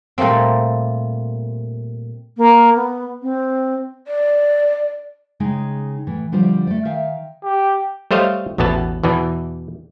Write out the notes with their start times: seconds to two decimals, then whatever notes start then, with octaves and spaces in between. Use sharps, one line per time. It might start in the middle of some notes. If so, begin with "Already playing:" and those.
0.18 A#2 G3 A3 A#3 C4
2.37 A#3
2.75 B3
3.22 C4
4.07 D5
5.40 C#3 G#3 D#4 G5
6.07 A2 E3
6.32 D3 F3 G3 F4 C5
6.67 A3 D5
6.85 D#3 E5 F5 G5
7.44 G4
8.11 G3 A3 C5 C#5 D#5 F5
8.58 A1 E2 B2 B3 A5
9.04 E2 B2 E3